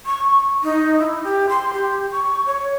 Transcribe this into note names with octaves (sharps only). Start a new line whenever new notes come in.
C#6
D#4
E4
G4
C6
G4
C#6
C#5